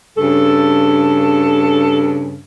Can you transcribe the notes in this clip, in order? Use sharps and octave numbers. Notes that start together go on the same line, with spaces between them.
G2 C#3 A4